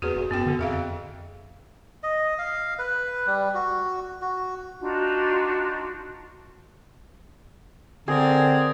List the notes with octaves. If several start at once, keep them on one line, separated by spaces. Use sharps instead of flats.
E2 F#4 G#4 B4
D#1
F#2 B3 F#4 G5
D3
F2 G#4 E5 F5
D#5
F5
B4
G3
F#4
F#4
D4 D#4 F4 F#4
D3 C4 G#4 A#4 D5